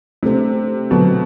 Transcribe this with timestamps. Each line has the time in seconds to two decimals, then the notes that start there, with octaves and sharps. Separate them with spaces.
0.23 C3 A3 D4 A4 C5
0.91 B2 D3 F#3 B3 F#4 A4